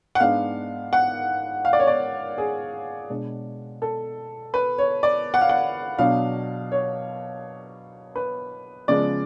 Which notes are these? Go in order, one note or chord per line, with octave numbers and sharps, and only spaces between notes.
F#5
G#2 G#3 B3 D4 F5
F#5
F5
D5
C#5
D5
G#4
B2 G#3 D4
A4
B4
C#5
D5
F#5
F5
F#5
B2 F#3 B3 D4 F5
C#5
B4
C#3 F3 G#3 B3 D5